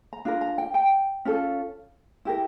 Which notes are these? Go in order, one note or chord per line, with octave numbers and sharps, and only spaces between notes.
A#5
D4 F4 A#4
A#5
G5
G5
C#4 F4 A4
E4 G4 A#4